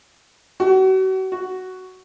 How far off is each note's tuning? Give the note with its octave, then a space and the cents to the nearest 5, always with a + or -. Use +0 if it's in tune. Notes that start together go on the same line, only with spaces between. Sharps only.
F#4 +35
F#4 +5